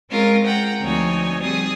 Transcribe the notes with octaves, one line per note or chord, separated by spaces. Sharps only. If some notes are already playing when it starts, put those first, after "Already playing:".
G#3 C4 C#4 F4 A#4
F#5 G5 A#5
D2 F3 C4 D#4 C#5 G#5
G3 C4 G#4 D#6